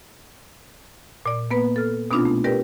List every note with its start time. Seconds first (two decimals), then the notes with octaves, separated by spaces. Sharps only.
1.26 A#2 D5
1.51 A#3 B3 B4
1.76 A4 F6
2.11 B2 B3 C4 D4 D#4 F4
2.25 A3
2.44 G4 A#4 B4 D5 G5